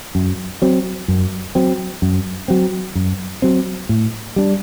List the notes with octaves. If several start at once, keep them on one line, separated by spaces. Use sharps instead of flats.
F#2
F#3 C4
F#2
F#3 C4
F#2
F#3 C4
F#2
F#3 C4
A2
G3 D4